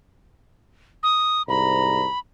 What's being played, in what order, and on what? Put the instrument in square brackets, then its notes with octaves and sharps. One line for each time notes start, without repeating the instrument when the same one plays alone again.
[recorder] D#6
[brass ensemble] C2 G#2 A#5 [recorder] B5